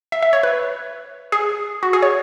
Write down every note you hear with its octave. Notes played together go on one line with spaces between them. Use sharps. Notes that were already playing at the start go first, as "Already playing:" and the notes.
E5
E5
C#5
B4
G#4
F#4
G#4
C#5